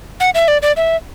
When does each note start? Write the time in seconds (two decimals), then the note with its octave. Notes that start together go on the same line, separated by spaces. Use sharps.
0.20 F#5
0.35 E5
0.48 D5
0.62 D5
0.77 E5